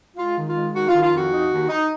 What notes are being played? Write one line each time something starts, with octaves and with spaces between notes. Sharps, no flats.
G#3 F4
D#3
F4
G#3
D#3 F#4
F4
D#3
F4
F2 F#4
D#4
D#2
D#4